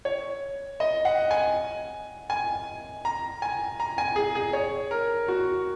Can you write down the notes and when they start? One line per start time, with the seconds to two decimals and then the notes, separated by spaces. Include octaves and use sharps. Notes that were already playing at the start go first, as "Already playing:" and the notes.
0.05 C#5
0.80 D#5
1.05 F#5
1.31 G#5
2.30 G#5
3.05 A#5
3.42 G#5
3.80 A#5
3.98 G#5
4.16 G#4
4.35 G#4
4.53 C#5
4.91 A#4
5.28 F#4